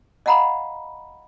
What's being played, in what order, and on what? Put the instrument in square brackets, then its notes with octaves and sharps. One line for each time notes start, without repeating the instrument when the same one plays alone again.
[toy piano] D#5 F5 F#5 A#5 B5